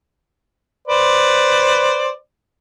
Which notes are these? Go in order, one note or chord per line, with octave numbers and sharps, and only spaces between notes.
B4 C5 D5